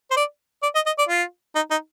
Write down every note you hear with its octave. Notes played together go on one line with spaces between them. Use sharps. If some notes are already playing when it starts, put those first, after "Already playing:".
C5
D5
D5
D#5
D#5
D5
F4
D#4
D#4